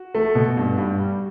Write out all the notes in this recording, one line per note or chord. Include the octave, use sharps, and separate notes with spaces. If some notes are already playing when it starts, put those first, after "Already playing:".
Already playing: F#4
A3
B2
G2
G2
G3